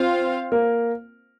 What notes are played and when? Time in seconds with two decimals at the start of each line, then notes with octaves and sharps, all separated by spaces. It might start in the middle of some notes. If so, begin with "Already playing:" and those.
Already playing: C4 F4 C5 F5
0.52 A#3 A#4